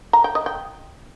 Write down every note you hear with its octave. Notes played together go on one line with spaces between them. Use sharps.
A#5
G5
D#5
G5